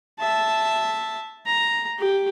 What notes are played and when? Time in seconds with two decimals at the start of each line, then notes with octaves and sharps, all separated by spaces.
0.19 E5 A5
1.46 A#5
1.98 G4